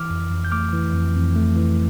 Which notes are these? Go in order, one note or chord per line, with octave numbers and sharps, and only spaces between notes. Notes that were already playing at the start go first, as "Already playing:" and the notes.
Already playing: E3 D6 F6
F2
F2
G6
A3 D6 F6
E3
F2
F2
A3
E3